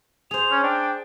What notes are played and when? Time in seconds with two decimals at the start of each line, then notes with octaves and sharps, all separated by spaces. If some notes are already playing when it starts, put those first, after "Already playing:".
0.31 G#4 C5 F7
0.51 C#4
0.63 D4 G5